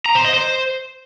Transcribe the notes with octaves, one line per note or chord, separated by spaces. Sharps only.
A#5
C5
D#5
C5